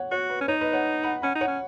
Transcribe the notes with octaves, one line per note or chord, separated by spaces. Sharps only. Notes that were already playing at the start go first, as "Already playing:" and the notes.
Already playing: C#5 F#5
F#4 C#5
B4
C#4
D#4 C#5
B4 D#5
C#5 F#5
F#5 B5
C#4 F#5 B5
D#4
C#5 F#5
C#4